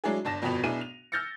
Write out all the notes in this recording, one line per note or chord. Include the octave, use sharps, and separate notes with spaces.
F#3 G#3 D4 E4 G#4
G1 D4 A5 A#6 E7
G1 F2 B2 B3 B5 F7
B1 B3 D4 E4 G#4 D#7
F7
E6 F6 G6 A6 A#6 C#7